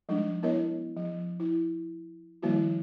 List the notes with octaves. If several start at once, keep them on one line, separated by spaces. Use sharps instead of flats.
F3 G3 G#3 D4 D#4
B3 E4 A#4 C#5 D#5
F3
E4
D#3 F3 G3 A#3 E4 F#4